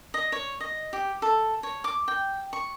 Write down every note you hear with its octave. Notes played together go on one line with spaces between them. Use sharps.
D#5
C#5
D#5
G4
A4
C#5
D6
G5
C#6